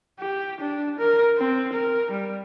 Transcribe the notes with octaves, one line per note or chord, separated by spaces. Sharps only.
G4
D4
A#4
C4
A#4
G3